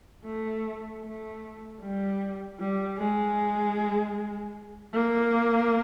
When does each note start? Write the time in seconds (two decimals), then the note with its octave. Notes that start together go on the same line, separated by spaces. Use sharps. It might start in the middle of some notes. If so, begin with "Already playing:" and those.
0.25 A3
1.03 A3
1.81 G3
2.59 G3
2.98 G#3
4.93 A#3